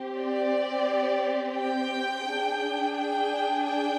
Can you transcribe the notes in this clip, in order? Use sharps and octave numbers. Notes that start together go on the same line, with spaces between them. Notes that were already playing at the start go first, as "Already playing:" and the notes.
Already playing: C4 G4
D5
G5
D4 G#4
G5
G5